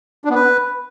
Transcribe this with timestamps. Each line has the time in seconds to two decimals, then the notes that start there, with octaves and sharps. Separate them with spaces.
0.25 D4
0.30 B3
0.35 B4